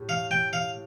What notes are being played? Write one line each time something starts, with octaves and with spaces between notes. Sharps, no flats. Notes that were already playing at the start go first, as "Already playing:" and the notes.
Already playing: A2 G3
F5
G5
F5